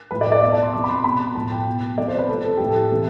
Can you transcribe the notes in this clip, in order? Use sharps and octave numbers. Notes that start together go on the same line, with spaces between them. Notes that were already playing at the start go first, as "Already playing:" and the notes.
A2 F3 B4
D5
D5
B2 E5
A5
C6
C3 F3 D6
B5
C6
B2 B5
A2 F3 A5
G5
B2
C3 F3 D5
C5
B4
C3 F3 A4
A4
A2 F3 G4
A4
C3 E3